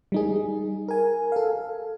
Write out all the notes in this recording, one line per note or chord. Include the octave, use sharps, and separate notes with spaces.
G3 D#4 G#4
A#4 G#5
A4 F5